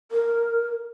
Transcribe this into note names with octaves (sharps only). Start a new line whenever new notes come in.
A#4